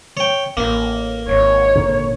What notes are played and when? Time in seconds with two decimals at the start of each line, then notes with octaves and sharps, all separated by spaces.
0.17 C#5 G5
0.57 A1 A#3
1.28 G#1 C#5
1.76 A#2 D3